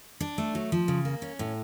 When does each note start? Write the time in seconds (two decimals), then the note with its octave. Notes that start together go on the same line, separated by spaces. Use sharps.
0.20 D4
0.38 A3
0.55 F#3
0.72 F3
0.88 C#3
1.05 A#3
1.22 C#4
1.39 A2